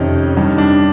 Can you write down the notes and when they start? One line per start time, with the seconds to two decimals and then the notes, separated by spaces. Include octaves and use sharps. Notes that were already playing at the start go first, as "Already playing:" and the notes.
Already playing: F2 C3 D#3 C#4
0.37 G2 D#3
0.58 D4